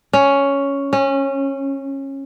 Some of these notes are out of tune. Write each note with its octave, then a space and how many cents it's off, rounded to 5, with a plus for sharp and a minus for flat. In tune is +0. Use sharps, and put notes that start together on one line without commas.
C#4 +5
C#4 -20